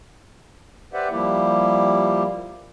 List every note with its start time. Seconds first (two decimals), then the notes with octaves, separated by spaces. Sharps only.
0.93 G4 B4 C5 D5 E5 F#5
1.11 F3 G3 A#3 E4 G4